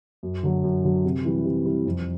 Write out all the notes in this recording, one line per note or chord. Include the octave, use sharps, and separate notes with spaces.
F#2
D3 F#3
F#2
D3 F#3
C3
E3 G3
C3
E3 G3
F2